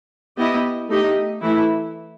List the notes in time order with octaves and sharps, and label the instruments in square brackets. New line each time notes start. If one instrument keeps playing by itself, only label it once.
[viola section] B3 E4 G4 D#5
A3 D#4 G4 D#5
E3 A3 E4